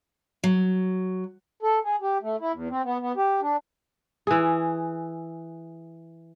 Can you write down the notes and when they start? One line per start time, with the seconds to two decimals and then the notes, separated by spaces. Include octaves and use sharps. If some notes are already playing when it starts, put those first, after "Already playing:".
0.44 F#3
1.63 A4
1.84 G#4
2.02 G4
2.22 A3
2.40 E4
2.53 E2
2.70 C4
2.84 B3
3.00 B3
3.17 G4
3.41 D4
4.27 E3 G#4